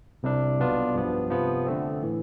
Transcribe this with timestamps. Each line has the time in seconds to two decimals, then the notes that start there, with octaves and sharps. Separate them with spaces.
0.23 C2 C3 G3 D4
0.59 B1 B2 B3 D4 F4
0.95 G2 F3 B3
1.31 C3 F3 B3
1.66 D3 A3 C4
2.02 A2 E3